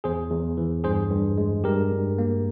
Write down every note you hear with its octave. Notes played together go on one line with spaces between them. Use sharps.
E2 G#4 C5
E2
E3
G2 G#4 C5
G2
G#3
G2 G4 A#4
G2
A#3